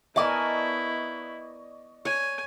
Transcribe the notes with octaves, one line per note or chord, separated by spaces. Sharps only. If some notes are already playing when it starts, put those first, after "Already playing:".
B3 E4 A#4 D5 D#5 G#5 A5 C#6
C#5 G#5